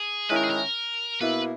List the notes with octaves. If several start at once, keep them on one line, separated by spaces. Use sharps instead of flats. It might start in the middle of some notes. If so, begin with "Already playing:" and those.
Already playing: G#4
D#3 G#3 C#4 E4 B4
A#4
G#4
A#4
B2 A#3 E4 B4